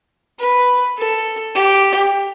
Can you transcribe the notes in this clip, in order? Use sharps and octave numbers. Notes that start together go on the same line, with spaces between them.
B4
A4
G4